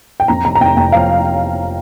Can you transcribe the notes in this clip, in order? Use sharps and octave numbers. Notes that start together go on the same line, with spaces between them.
G5
F2 A#5
F1 A#5
A#5
F1 G5
F1 G5
F3 F5